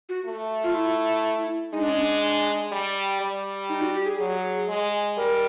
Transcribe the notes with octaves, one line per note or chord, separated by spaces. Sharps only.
F#4
A3
F4
E4
G#3 D#4
D4
C#4
D4
G3
G3
D#4
F#4
G4
G#4
F#3 G#4
G#3
G3 A#4